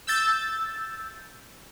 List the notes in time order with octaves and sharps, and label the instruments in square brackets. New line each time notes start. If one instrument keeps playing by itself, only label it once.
[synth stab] E6 G6 A6